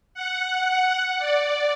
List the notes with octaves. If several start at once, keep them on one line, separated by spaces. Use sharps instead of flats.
F#5
D5